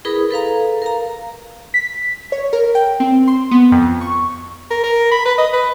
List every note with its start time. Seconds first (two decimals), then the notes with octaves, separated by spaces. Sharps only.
0.05 E4 G#4 A#4 B4 B5 D#6
0.31 A4 B4 F5 A#5
0.82 A#4 F5 A#5
1.74 B6
2.32 C#5
2.53 A#4
2.75 G5
3.00 C4
3.28 C6
3.51 B3
3.72 F2
4.01 C#6
4.71 A#4
4.84 A#4
5.11 B5
5.26 B4
5.38 D#5
5.53 B4